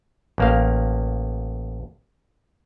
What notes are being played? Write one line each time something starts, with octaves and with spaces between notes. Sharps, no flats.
A1 A#3 F5